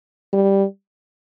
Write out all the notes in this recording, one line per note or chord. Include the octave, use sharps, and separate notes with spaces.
G3